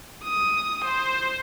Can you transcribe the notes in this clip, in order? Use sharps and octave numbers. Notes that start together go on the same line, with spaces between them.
D#6
C5